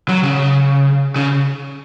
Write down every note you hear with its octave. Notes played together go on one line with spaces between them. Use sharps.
F#3
C#3
C#3